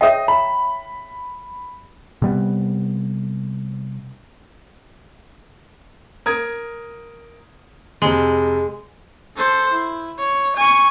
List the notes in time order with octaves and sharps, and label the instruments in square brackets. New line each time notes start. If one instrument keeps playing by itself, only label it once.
[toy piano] C#5 E5 G5 [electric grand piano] D#5 D#6
[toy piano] A#5 [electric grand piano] B5
[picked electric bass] C3 G3 B3
[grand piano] A#4 D#6 G#6
[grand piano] F2 C3 [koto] G#3
[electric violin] A4 C5
E4
C#5
G#5 C#6